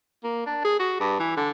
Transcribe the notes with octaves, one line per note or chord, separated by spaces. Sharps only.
A#3
D4
G#4
F#4
G2
E3
D3